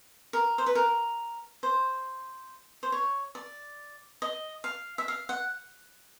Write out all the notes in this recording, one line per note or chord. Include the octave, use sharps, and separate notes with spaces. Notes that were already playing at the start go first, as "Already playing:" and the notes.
A#4
C5
B4
A#4
C5
C5
C#5
D5
D#5
F5
E5
F5
F#5